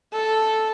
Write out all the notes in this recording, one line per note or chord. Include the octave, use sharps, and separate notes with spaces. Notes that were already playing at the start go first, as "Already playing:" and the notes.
A4